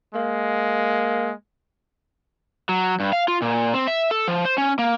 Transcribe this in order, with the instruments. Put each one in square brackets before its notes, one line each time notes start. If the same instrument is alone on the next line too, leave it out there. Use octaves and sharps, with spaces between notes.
[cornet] G#3 [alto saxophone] A#3
[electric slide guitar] F#3
G2
F5
F4
A#2
C4
E5
A4
F3
C5
C#4
A#3